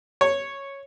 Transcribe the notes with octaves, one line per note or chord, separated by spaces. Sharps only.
C#5